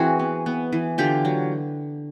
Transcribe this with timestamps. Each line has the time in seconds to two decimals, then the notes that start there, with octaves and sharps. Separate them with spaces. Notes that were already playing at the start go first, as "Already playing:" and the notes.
Already playing: E3 C4 F#4 G#4
0.19 B3
0.46 B3
0.72 E3
0.98 D3 F4 G4
1.25 F#3